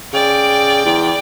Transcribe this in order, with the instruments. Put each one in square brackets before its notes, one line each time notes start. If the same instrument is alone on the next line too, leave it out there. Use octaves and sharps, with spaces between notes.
[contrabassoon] C#3 [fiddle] D5 G5
[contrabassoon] E2